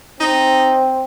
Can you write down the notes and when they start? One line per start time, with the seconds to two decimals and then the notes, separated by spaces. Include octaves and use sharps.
0.20 C4 D#4